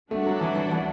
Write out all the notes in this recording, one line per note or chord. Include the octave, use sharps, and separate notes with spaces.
G3 A3 D4 F#4 A4
F#3
E3
E3
E3